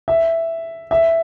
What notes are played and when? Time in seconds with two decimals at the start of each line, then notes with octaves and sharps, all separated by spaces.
0.08 E5
0.91 E5